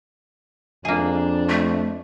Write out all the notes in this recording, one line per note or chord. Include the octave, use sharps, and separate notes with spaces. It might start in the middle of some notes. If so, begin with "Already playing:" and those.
F2 A#3 D4 G#4
A3